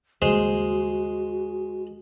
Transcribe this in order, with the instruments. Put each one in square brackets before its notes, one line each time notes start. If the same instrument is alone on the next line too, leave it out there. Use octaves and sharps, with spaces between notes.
[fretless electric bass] D#2 C#3 G3 [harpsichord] G#3 C5 [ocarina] F#4